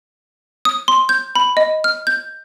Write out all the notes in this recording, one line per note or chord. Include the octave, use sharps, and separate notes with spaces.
D#6
C6
G6
B5
D#5
F6
G6